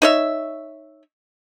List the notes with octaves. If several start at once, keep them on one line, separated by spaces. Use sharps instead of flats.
D#4 C#5 E5